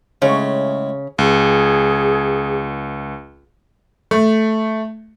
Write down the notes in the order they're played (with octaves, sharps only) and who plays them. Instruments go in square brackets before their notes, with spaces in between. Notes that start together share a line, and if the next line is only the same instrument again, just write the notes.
[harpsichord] A2 G#3 [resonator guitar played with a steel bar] C#3 [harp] C#5
[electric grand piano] C#2 [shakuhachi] G#4
[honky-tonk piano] A3